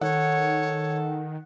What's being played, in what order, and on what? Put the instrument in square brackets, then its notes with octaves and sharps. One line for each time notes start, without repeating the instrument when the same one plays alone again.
[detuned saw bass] D#3 [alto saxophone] A4 [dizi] C#5 [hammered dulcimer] F#5